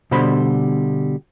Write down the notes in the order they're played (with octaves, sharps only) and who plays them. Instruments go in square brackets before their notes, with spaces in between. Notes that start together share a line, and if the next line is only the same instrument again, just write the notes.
[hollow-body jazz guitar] B2 D3 G3 C5 B5